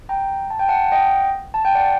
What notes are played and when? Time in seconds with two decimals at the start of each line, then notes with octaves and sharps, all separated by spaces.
0.09 G5 A#5
0.50 A5
0.59 G5
0.68 F#5 A5
0.87 F#5
0.92 D#5 G5
1.54 A5
1.65 G5
1.75 D5 F#5